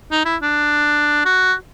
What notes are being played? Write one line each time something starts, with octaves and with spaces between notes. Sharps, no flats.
D#4
E4
D4
F#4